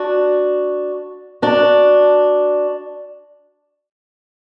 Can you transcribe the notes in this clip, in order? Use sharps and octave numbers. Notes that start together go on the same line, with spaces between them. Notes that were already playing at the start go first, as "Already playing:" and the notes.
Already playing: D4 F#4
D4 F#4